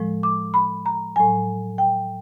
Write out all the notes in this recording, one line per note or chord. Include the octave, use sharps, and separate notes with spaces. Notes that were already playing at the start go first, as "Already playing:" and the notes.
Already playing: A2 F3 G#3
D6
B5
A#5
A2 F#3 G#5
G5